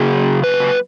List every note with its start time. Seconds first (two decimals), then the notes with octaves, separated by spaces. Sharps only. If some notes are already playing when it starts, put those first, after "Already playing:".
Already playing: C#3 F#3 A#3 G#4
0.44 B4